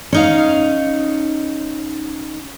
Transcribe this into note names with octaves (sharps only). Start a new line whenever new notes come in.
C#4 D#4 F5